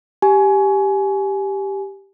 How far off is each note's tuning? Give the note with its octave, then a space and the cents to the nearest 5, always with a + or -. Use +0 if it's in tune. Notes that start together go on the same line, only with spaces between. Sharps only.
G4 +0 G#5 +20